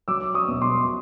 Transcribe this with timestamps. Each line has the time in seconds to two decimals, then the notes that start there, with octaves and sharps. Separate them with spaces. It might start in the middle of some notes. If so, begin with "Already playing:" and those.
0.08 F#3 D6 E6
0.34 C#6 D#6
0.48 B2
0.62 C6 D6